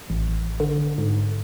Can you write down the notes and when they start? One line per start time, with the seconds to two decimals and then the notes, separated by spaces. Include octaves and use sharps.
0.10 A1
0.60 D3
0.98 G#2